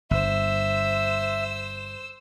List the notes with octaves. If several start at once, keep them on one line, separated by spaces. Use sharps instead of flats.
G1 C5 E5 E6